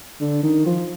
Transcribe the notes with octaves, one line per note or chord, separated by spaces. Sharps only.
D3
D#3
F3